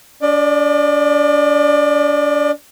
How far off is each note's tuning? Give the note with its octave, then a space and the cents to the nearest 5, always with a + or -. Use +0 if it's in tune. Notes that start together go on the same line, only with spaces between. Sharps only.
D4 -35 D5 +30